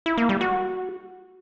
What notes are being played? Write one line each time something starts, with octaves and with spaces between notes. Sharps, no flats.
E4
A#3
G3
F#4